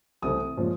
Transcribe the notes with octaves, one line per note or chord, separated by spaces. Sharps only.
C2 C3 E3 A3 C4 D#6
A#2 F3 G#3 C#4